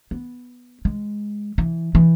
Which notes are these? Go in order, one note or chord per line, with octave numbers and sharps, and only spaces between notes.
B3
G#3
E3
E3